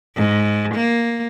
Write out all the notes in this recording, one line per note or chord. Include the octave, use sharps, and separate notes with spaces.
G#2
A#3